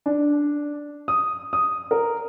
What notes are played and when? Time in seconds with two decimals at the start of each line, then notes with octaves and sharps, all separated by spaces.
0.06 D4
1.08 D#6
1.53 D#6
1.91 A#4